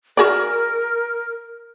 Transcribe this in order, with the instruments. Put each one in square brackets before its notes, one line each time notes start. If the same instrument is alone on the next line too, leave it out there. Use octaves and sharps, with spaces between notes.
[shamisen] F#4 G#4 D5 [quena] A#4